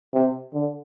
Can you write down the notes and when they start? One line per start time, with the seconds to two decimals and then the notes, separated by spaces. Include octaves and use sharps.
0.13 C3
0.54 D3